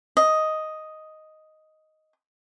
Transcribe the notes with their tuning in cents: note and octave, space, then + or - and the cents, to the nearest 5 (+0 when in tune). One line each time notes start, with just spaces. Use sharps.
D#5 +5